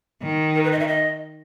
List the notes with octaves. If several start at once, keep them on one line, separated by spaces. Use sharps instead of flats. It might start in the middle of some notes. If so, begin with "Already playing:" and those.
D#3
A#4
B4
D#5
E5
D#5